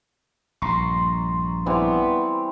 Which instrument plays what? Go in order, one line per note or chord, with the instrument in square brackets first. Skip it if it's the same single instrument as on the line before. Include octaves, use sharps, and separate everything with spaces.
[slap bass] A#1 G2 [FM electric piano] A#5 C6 C#6
[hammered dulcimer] E3 G3 C4 [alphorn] B3